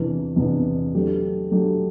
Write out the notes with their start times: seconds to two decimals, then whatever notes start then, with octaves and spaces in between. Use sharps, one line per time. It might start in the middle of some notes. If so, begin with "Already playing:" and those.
Already playing: E2 C3 E3 B3 D4
0.36 E2 C3 E3 B3 D4
0.94 F#3 A3 D4 G4
1.51 F#3 A3 D4 G4